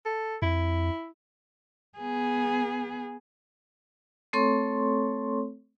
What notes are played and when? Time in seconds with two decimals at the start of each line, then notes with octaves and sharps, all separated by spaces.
0.06 A4
0.42 F2 E4
1.99 B3 G#4
4.33 A3 C4 A4 C#5 C6 C#6